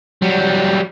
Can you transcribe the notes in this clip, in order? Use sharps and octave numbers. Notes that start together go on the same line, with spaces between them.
F#3 G3